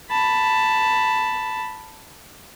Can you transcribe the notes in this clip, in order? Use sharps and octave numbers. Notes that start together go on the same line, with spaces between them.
A5 B5